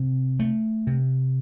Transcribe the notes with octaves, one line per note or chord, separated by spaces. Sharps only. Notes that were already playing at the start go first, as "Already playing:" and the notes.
Already playing: C3
A3
C3